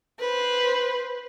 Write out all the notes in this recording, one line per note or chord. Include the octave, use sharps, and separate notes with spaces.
B4 C5